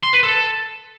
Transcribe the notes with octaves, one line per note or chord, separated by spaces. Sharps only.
C6
B4
A4